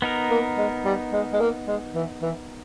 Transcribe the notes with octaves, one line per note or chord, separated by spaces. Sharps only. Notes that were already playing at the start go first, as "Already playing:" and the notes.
B3 D#4 A#4
A#3
G#3
G3
G#3
G#3
A#3
G#3
E3
E3